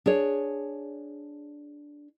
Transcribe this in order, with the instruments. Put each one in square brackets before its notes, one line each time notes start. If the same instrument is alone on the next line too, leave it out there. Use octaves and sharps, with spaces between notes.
[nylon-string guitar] D4 G#4 C#5